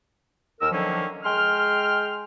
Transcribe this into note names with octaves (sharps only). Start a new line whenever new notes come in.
D#2 A#4 E6
D3 D#3 F3 F#3 A#3 C#4
G#3 G5 C6 F6